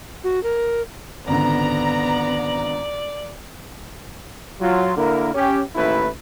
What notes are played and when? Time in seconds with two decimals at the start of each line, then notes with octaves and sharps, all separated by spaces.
0.24 F#4
0.43 A#4
1.28 G#1 C#2 D3 B3 D5 A#5
4.61 F#3 F4
4.97 D3 A#3 E4 A#4
5.34 C#4 G4
5.75 A1 D#2 A3 E4 B4